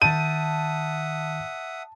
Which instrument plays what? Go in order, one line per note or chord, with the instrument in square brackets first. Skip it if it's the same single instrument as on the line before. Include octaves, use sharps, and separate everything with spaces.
[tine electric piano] D#3 G6 [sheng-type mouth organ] E5 F#5 D#6 [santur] A5 [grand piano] D#7